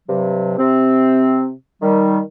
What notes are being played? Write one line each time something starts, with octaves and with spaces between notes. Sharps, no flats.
G2 C3 F#3
C3 C4
D#3 G3